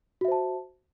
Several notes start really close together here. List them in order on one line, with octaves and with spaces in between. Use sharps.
F#4 E5 C5 A5